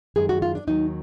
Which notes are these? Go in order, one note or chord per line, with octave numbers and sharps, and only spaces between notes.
F#2 D#3 G#3 G#4
F#4
F4
D4
D#2 D#3 F#3 D#4